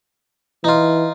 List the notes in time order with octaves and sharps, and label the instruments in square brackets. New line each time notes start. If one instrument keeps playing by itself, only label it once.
[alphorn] E3 [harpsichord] D#4 F4